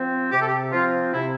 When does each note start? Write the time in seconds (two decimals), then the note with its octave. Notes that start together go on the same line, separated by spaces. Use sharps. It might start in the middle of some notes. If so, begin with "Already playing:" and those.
Already playing: F3 C4
0.31 C3 G4
0.40 A4
0.47 G4
0.72 F3 C4 F4
1.13 C3 E4